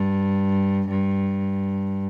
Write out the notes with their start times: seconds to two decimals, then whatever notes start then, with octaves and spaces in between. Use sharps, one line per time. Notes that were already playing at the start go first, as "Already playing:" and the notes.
Already playing: G2
0.88 G2